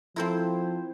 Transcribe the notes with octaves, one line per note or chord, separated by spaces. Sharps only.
F3 C4 E4 A4 A#4 C5